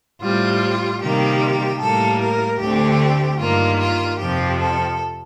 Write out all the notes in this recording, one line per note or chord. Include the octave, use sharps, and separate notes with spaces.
A2 G3 C4 F4
C3 D#3 G3 A#3 G4
A2 G3 A#3 A4
A#4
D2 D3 A3 C4 G4
G2 D#3 A#3 F4
F4
F2 C3 F3 C4 G4
A4